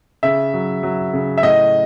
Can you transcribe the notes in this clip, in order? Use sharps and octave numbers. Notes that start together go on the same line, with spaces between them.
C#3 E5
F#3
F#3
C#3
E5
A2 D#5